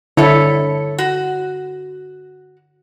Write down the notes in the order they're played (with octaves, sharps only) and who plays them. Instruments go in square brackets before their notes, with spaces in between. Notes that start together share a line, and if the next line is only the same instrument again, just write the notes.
[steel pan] D3 E4 [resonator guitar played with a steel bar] A4 C#5
[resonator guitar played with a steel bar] F#4